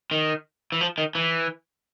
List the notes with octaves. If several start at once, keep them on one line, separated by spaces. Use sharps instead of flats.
D#3
E3
F3
D#3
E3